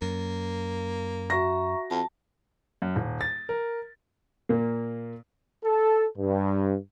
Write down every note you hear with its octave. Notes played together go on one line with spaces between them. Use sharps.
F#2 A#3
F#4 E5 A#5 C#6 A#6
F2 A5
F#2
D#1
A6
A#4
A#2 A#3
A4
G2